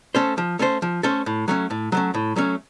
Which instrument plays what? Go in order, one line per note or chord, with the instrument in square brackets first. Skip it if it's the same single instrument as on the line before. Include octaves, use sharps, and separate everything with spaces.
[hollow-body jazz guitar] A3 C#4 A4 C5
F3
A3 C#4 A4 C5
F3
A3 C#4 A4 C5
A2
F#3 A3 C#4
A2
F#3 A3 C#4
A2
F#3 A3 C#4